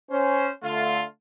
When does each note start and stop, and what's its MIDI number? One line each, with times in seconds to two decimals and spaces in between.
0.11 0.49 61
0.11 0.49 72
0.63 1.03 50
0.63 1.03 57
0.63 1.03 65